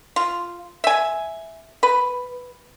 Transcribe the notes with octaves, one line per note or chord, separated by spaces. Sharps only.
F4
E5 G#5
B4